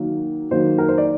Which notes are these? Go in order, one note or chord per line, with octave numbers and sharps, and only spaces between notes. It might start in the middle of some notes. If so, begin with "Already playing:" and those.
Already playing: D#3 F#3 A#3
D#3 F#3 A#3 C5
A#4
C5
D5